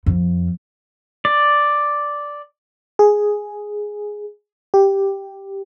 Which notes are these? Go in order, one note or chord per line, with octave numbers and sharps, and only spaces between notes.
F2
D5
G#4
G4